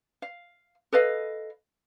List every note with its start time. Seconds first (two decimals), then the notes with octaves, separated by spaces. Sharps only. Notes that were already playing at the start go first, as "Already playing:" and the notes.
0.22 F5
0.93 A4 B4 D#5 F5